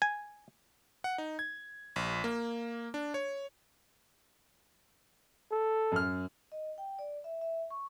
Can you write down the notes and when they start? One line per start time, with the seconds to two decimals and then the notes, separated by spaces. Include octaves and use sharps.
0.02 G#5
1.04 F#5
1.18 D#4
1.39 G#6
1.96 A#1
2.24 A#3
2.94 D4
3.14 C#5
5.51 A4
5.92 F#2 F6
6.52 D#5
6.78 G5
6.99 D5
7.24 E5
7.41 E5
7.71 C#6